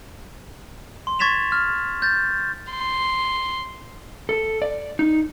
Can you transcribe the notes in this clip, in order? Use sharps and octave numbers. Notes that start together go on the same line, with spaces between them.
C6
C#6 G#6 A6 B6 E7 F7
F6
G6 A6
C6
A4
D5
D#4